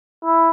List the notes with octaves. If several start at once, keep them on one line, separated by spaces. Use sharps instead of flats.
E4